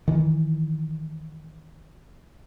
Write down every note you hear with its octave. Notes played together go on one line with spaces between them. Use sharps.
D#3 E3